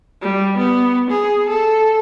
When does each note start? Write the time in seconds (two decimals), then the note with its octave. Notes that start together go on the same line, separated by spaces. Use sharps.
0.21 G3
0.57 B3
1.10 G#4
1.49 A4